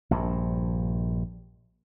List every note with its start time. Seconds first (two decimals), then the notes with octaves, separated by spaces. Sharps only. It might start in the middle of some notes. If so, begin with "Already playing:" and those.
0.11 A#1 G2